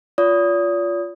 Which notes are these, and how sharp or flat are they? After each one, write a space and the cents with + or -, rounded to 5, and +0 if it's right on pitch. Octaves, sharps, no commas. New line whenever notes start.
F4 +0 D5 -45 D#6 +0